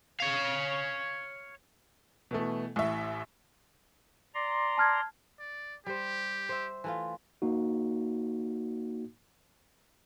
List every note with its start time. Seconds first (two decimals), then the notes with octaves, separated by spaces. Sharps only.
0.20 C#5 F5
2.31 B2 E3 A3
2.76 A1 A2 E5
4.34 D5 A#5 C6
4.78 A5 F6 G#6
5.39 D5
5.86 G3 G4 C5
6.49 C5 E5
6.84 E3 A3 F4
7.42 A#3 D#4 F#4